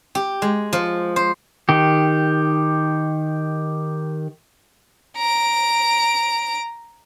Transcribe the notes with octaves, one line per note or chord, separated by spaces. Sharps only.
G4
G#3
F3
C5
D#3 G4
A#5 D7